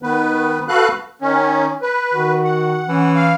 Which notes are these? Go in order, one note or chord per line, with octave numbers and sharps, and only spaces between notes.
D#3 B3 B4
F#4 A4 B4 F5 F#6
D#3 C#4
B4
D#3 F#4
F#5
E3 C#4
F5